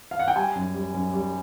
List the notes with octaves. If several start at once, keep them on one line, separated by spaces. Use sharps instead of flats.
F5
F#5
G5
G3 G#5
F#2
G3
F#2
G3